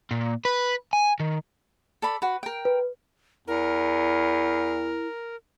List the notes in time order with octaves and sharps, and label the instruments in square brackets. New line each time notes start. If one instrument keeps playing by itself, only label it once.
[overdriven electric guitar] A#2
B4
G#5
D#3
[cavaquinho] A4 D5 B5
F#4 B4
A#4 G5
[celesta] B4
[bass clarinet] E2 [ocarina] E4 [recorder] A#4